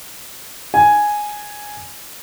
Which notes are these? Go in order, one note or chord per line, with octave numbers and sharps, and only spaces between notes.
G#5